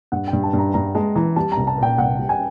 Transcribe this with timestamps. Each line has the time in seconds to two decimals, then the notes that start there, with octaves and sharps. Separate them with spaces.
0.12 G2 F#5
0.28 G5
0.33 G2
0.43 A5
0.53 G2
0.59 A#5
0.74 G2 A#5
0.95 G#3 A5
1.15 E3 A#5
1.36 G3 A5
1.52 A#5
1.57 C2
1.67 A5
1.78 A#2 G5
1.98 C2 F#5
2.19 G3
2.29 G#5